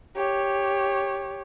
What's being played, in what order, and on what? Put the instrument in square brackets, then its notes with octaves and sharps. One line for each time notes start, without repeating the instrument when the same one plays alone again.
[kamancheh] G4 C#5